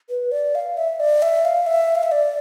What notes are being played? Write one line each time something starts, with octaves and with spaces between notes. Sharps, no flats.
B4
D5
F5
E5
D5
E5
F5
E5
F5
E5
D5